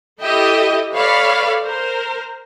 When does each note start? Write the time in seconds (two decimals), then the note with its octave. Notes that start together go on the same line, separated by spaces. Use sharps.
0.20 E4 G4 A4 D#5 E5 G5
0.93 A4 B4 C#5 D5 F5 B5
1.64 A#4 C5